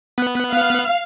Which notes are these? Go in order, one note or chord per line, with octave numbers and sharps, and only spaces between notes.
B3 F#6
F5